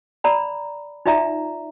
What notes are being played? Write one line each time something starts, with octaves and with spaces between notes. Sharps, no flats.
D5 A#5 B5
D#4 F4 D5 E5 A#5